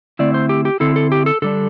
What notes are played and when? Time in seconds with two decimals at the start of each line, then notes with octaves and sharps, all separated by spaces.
0.19 D3 A3 C4 E4 D5
0.34 C5
0.49 G4
0.65 G4
0.80 D3 C4 E4 A4
0.96 A4
1.12 G4
1.26 A4
1.42 D3 G3 D4 A4